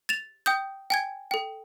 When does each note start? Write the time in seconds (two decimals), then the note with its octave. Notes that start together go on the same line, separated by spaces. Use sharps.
0.09 A6 E7 F7
0.46 G5 D#6 G6
0.90 G5 G#5 G#6
1.31 A4 G5